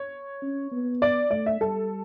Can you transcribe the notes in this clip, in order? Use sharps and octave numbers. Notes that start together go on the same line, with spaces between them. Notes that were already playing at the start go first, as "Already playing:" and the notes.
Already playing: C#5
C#4
B3
D5
A3 D5
E5
G3 A4